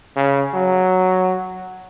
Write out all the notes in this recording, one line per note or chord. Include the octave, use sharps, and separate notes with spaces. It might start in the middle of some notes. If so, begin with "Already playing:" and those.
C#3
F#3